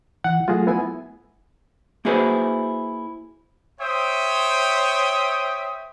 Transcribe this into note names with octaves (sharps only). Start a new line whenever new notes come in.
E3 F#5
F#3 A3 F4 F#4 G#4
B3 E4 G#5
A#3 E4 F#4 G#4 B4 C5
C5 C#5 E5 G5 D#6